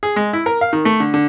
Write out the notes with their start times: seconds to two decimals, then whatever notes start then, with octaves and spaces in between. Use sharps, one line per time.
0.03 G#4
0.16 G#3
0.33 E4
0.46 A#4
0.61 F5
0.73 D#3
0.85 A3
1.00 D3
1.14 D3